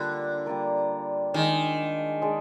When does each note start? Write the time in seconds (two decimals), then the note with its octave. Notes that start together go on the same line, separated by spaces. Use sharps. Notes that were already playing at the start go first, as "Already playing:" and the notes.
Already playing: D3 G3 A#3 F4 A#4
0.46 G3 A#3 F4 A#4
1.34 D#3 G#3 D4 G#4 D5
2.22 G#3 D4 G#4 D5